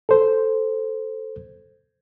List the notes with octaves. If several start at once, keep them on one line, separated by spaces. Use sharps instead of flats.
A4 C5